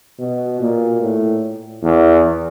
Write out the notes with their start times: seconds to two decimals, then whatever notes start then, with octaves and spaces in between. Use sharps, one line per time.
0.19 B2
0.60 A#2
1.01 A2
1.83 E2